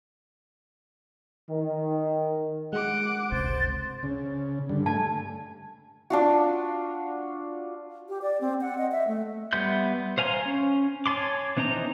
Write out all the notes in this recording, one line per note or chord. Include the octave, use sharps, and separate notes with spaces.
D#3
G#3 F#5 D6
G1 C#2 C3 C5 A6
C#3
G2 D3
A3 G#5 A5
D4 F4 F#4
G4
D5
C4
F#5
D#5
E5
A3
G3 B3 E5 C6 G6
C5 F5 G#5 A#5 C6
C#4
C#5 G#5 A5 C6 D6
E3 C4 D#4 C5 A#5